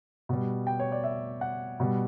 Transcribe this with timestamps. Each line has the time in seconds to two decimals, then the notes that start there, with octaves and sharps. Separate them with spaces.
0.29 B2 G3
0.67 G5
0.80 C#5
0.92 D5
1.04 E5
1.41 F#5
1.80 B2 G3